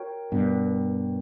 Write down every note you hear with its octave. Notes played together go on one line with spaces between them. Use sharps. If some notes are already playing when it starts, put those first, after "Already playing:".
Already playing: F#4 A#4 C#5 G5
G2 B2